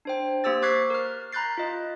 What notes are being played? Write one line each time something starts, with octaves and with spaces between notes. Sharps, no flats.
D4 C5 G5
A#3 G4 C5 E6 A6
C#6 D6 F#6 G#6 B6 C7
A#4 F6
A#5 B5 F#6 G6 A6 C7
F4 D#5